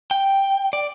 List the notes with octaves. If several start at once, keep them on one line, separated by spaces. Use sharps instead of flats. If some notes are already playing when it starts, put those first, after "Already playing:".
G5
D5